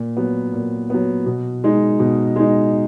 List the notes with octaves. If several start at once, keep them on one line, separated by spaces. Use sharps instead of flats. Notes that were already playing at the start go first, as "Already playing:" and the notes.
Already playing: A#2
F#3 B3
A#2
F#3 B3
B2
G#3 D#4
B2
G#3 D#4